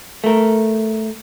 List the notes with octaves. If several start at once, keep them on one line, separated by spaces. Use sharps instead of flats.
A3 A#4